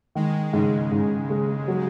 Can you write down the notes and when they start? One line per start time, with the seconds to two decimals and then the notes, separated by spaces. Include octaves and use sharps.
0.15 D#3 G#3
0.53 G#2 C#3
0.91 G#2
1.30 G#3
1.68 F#3